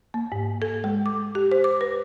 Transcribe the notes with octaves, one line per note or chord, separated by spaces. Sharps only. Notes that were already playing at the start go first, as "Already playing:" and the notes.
A#3
G#2
A4
G#3
D6
G4
C5
D6
B4